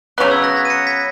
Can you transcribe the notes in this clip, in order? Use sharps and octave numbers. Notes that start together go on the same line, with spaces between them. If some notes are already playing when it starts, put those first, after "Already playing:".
C#3 F#3 B3 F#6
E6 G#6
F#6 A#6
G#6 B6
D#7
A#6 C#7
G#6 B6